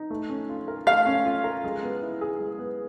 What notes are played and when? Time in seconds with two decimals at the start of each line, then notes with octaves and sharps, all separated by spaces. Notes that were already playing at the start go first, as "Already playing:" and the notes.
Already playing: D#4
0.10 A3
0.30 C#4
0.49 F4
0.68 A#4
0.86 A3 F5
1.06 C#4
1.25 F4
1.44 A#4
1.64 G#3
1.83 B3
2.02 E4
2.21 G#4
2.40 G#3
2.59 B3